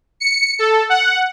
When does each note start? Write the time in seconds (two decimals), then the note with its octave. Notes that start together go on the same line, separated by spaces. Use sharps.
0.20 C#7
0.59 A4
0.89 F#5